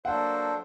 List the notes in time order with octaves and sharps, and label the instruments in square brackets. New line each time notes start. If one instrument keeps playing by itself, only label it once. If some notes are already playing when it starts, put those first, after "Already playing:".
[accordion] F#3 A#3 D4 A4 C5 [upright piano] F#5